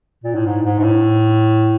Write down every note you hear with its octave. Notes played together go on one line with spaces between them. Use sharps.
A#2
A2
G#2
G#2
G#2
A2